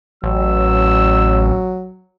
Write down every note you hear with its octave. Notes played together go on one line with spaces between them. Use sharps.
A1 F#3 E6